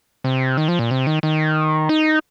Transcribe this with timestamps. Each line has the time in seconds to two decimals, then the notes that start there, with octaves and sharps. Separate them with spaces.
0.24 C3
0.57 D#3
0.68 F3
0.79 A#2
0.91 C3
1.07 D#3
1.23 D#3
1.89 D#4